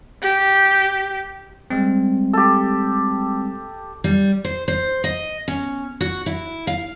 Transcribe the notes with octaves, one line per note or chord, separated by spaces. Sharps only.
G4
G3 G#3 C4
G4 A4
G3
C5
C5
D#5
C#4
F#4
E4
F5